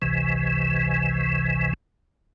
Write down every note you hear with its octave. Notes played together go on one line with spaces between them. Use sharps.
G#1 C#2 C3 E3